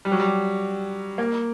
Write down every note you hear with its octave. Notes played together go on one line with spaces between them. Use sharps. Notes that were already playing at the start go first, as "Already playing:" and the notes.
G3
F#3
G3
A#3